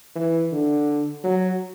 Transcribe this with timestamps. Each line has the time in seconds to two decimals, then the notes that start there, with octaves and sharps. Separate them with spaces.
0.16 E3
0.52 D3
1.24 F#3